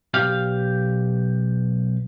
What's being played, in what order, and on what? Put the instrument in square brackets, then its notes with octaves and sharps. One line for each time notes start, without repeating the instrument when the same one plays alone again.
[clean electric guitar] B1 G4 F5